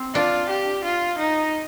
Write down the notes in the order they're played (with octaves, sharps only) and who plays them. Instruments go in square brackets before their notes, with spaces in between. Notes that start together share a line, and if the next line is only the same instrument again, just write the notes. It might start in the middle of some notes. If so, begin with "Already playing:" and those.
Already playing: [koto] C4
[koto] D4 [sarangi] F4
[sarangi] G4
F4
D#4